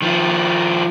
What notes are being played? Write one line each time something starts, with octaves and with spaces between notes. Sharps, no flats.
D#3 F3